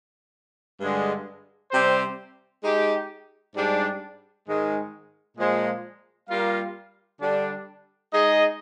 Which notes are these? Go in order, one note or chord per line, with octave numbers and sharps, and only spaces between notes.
G2 D3 G#3
C3 G3 C4 G4 C5
G#3 D#4 G4
G#2 G3 D4
G#2 D#3 G#3
A#2 F3 G#3
G3 A#3 F4 A#4 F5
D3 G3 D4
G#3 D#4 G#4 D#5